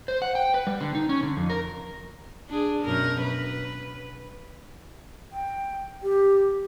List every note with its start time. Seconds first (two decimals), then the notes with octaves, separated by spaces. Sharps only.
0.08 C5
0.22 F#5
0.35 G5
0.54 B4
0.67 G3
0.80 D3
0.95 D#4
1.09 C#4
1.23 D3
1.37 F2
1.50 A#4
2.50 D4 G#4
2.84 F#2 B2 A#4
3.22 B4
5.32 G5
6.03 G4